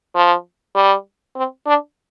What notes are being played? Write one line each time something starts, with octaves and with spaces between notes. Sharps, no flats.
F3
G3
C4
D4